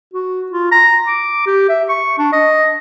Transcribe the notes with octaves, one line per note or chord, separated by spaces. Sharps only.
F#4
F4
A#5
D6
G4
E5
C#6
D4
D#5